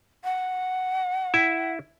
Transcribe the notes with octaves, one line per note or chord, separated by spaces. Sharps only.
F#5
E4 E5